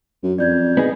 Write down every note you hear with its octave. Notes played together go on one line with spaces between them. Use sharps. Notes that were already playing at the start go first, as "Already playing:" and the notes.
F#2
F2 D5 G6 G#6
B3 D#4 G#4